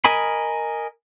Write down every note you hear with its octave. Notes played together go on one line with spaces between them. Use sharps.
A#4 D#5 G#5 B5